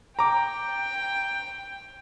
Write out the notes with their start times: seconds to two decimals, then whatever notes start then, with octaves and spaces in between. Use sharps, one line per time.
0.19 G5 A#5 D6